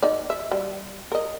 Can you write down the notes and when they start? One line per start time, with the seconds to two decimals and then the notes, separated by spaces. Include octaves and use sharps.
0.03 D#4 D5
0.30 E5
0.52 G3
1.12 A#4 D#5